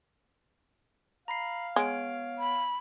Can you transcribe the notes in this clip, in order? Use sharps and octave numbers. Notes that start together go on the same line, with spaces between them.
F5 A#5 B5 C7
G#3 B3 C#5 D7
B5